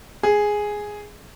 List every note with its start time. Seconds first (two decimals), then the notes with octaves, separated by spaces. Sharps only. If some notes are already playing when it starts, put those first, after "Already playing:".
0.23 G#4